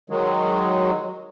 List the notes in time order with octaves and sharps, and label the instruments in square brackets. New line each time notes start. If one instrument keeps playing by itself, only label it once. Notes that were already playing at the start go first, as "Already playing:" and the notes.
[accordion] D#3 F#3 G#3